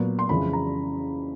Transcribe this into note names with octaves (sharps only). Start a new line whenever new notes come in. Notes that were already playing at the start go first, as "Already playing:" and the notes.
Already playing: A#2 F#3 B3
C6
F2 C#3 E3 G#3 B5
A#5